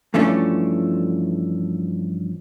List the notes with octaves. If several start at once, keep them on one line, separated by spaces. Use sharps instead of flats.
G2 E3 F3 A3 C#4 D4